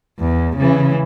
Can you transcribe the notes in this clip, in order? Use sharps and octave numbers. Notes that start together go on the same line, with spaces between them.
E2
C#3 E3